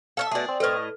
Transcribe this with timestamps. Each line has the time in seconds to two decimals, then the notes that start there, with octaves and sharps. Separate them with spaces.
0.17 A4 C#5 E5 F5
0.31 B2 A3 G#4 D5
0.49 C4
0.60 A2 A4 B4 D#5